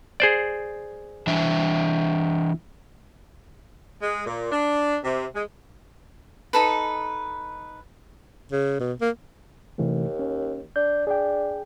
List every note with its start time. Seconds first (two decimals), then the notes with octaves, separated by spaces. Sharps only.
0.20 G#4 C5 D5
1.27 E3 D4 E5
4.00 G#3
4.24 A#2
4.50 D4
5.04 C3
5.34 G#3
6.53 D#4 A4 B4
8.52 C#3
8.80 B2
9.01 A#3
9.78 D#2 C3 E3 A3
10.19 C#4
10.76 D4 G6
11.07 D4 G#4 G5